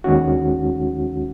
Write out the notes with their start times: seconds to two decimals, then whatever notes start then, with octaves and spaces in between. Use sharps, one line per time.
0.04 D#2 D#3 G#3 C#4 F#4